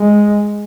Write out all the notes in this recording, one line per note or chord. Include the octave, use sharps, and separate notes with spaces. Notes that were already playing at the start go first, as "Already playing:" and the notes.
Already playing: G#3